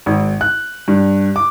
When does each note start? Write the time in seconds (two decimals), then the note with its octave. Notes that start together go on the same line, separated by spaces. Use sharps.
0.06 G#1
0.41 F#6
0.88 G2
1.36 D6